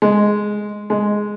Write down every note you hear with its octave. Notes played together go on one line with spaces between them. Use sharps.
G#3
G#3